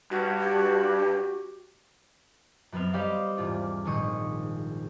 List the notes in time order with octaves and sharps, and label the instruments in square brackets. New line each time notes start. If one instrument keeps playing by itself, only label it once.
[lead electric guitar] G2 [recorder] F#4
[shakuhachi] G4
[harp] F#2 F#3 B3 C4 F6
G3 G4 C5 D5 D#5 F5
E1 G#2 F4 D5
F1 A#1 G#2 D#3 C#6 D#6